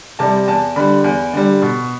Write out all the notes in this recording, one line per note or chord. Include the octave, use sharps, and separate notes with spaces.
C3 G3 A5
E2 A5
D3 G3 B5
E2
D3 G3
B2